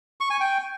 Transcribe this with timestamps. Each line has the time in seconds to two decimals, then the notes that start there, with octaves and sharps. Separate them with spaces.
0.21 C#6
0.30 G#5
0.40 G5